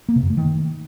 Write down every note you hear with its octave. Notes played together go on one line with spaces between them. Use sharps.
A#3
C3
F#2
A3
D#3